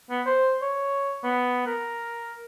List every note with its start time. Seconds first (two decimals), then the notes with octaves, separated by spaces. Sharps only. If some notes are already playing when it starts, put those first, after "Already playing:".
0.10 B3
0.26 C5
0.62 C#5
1.23 B3
1.66 A#4